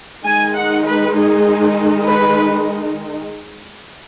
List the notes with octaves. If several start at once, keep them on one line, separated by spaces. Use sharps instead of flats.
D#3 G#3 D#4 G#5
F#5
B4
G#4
B4